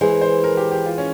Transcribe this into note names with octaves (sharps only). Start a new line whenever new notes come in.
E3 G#3 E4 G#4 C5
C5
A#4
G4
G4
F4
C#4